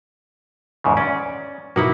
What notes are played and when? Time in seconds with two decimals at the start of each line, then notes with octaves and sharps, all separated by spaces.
0.84 E2 G#2 C#3
0.97 C#4 D5
1.76 B2 A#3 D#4 E4 F#5